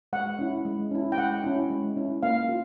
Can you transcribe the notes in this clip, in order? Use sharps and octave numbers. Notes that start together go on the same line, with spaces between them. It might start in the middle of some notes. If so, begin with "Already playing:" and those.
G#3 F#5
C#4 E4
G#3
C#4 E4
G5
G#3 F#5
C#4 E4
G#3
C#4 E4
A#3 F5
F4